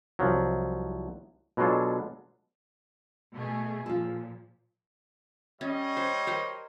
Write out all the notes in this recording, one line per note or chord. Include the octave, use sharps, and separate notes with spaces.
C2 F3 F#3
B2 F#3 G#3 D4 F4 A4
B2 A3 G#4
A#2 F3 F4 A4
G3 C#4 C#5 D#5
C5
A#4 C5 G5